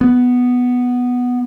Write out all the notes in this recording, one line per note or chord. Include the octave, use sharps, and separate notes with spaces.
B3